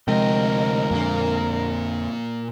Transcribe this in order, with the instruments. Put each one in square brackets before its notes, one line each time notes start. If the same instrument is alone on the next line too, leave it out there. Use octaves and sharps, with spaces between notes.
[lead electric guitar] D2 D#5 [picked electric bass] C3 F3 [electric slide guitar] G#3 G5 [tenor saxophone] A#4
[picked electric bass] F2 D3 [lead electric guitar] A#2 A#3